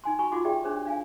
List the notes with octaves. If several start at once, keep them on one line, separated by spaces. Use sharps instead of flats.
D#4 G#5 C6
F#4 G#5 B5 C#6
D#4 F4 F#4 F#5 C6 D6
G4 G#4 D5 E5 G5
D4 G4 G#4 C5 C#5
D4 F5 G#5